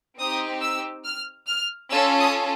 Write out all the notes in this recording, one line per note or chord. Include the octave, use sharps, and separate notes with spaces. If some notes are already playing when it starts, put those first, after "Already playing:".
C4 D#4 G4 D#6
E6
F6
F6
C#4 F4 A4 E6
D#6